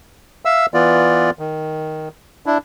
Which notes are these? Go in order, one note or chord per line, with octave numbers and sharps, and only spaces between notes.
E5 F5 E6
E3 B3 F4 D5
D#3
D4 E4